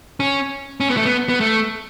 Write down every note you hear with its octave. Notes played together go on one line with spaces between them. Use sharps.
C#4
C#4
B3
A3
B3
B3
A3